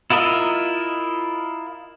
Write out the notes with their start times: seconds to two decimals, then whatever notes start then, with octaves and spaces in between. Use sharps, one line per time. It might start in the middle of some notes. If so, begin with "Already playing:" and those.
0.10 E4 F4 A#4 D#5 E5